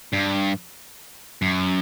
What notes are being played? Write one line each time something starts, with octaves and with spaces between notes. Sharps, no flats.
G2
F#2